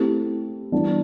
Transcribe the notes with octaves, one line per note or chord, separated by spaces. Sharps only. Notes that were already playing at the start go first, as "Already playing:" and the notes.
Already playing: A3 C4 E4 G4
E3 G3 B3 D4